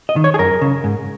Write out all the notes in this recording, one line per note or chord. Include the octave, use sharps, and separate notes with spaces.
D#5
D#3
C#5
G#4
F#2 A#4
C#3
G#2